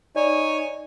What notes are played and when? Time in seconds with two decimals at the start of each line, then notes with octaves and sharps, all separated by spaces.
0.16 D#4 C#5 D5 G#5